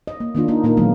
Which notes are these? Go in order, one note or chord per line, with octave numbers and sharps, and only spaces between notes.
D#5
A#3
D#3 A#3 D4 F4
A#3 D#4
A#2 A#3 D#4 A#4
A#2 D#3 F#3 G#3 A#3 B3